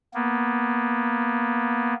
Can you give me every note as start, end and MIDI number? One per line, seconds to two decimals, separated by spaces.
0.14 1.94 58
0.14 1.94 59